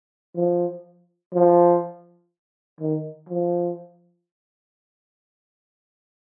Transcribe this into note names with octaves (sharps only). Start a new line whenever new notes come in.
F3
F3
D#3
F3